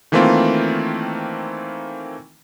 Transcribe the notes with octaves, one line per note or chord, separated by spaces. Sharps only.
D#3 E3 A3 A#3 C4 F4